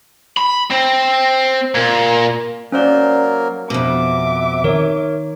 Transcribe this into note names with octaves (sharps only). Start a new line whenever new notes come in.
B5
C4
A#2
F#3 A#3 C#4 A#4 C5 D5
F2 B2 E5 D6
D#3 A#4 C#5